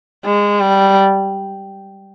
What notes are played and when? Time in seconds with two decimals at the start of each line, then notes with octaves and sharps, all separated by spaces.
0.25 G#3
0.60 G3